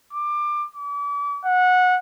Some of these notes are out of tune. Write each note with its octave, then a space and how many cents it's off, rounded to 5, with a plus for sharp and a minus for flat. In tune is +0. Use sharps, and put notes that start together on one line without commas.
D6 +25
D6 -40
F#5 -20